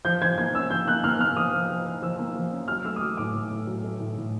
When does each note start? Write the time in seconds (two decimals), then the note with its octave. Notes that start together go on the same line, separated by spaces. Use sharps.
0.05 F3 G6
0.22 F3 G#6
0.38 A#3 G#6
0.54 C#4 E6
0.70 F3 G6
0.87 A#3 F#6
1.04 A#3 F6
1.20 A#3 F6
1.36 F3 D#6
1.53 F3
1.70 F3
1.86 F3
2.02 F3 E6
2.19 A#3
2.35 F3
2.51 C#4
2.68 F#3 F6
2.85 A3 E6
2.96 D#6
3.01 F#3 D6
3.17 A2 D6
3.34 A2
3.51 A2
3.67 F#3
3.83 A3
4.00 A2
4.17 A2